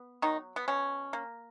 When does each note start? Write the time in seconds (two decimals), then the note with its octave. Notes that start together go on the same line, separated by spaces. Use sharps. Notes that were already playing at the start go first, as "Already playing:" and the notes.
Already playing: B3
0.22 D#3 F#3 D#4
0.56 B3
0.68 B2 C#4
1.13 A#3